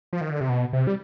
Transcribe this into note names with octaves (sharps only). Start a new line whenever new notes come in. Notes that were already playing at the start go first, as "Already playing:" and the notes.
F3
D#3
D3
C3
B2
C3
G3